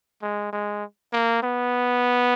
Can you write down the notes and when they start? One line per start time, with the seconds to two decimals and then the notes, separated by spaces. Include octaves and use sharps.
0.22 G#3
0.53 G#3
1.13 A#3
1.43 B3